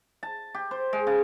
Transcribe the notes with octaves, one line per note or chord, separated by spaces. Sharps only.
A5
G4
C5
G#3
C#3